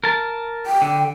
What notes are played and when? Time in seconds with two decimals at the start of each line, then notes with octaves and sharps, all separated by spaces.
0.04 A#4 A5
0.66 G5
0.82 D3